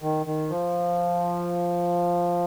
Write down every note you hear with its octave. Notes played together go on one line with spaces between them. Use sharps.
D#3
D#3
F3